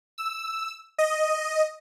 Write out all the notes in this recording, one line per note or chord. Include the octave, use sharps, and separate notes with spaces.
E6
D#5